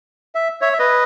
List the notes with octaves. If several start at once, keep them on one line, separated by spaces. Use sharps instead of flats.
E5
C#5 E5
E5
B4 D#5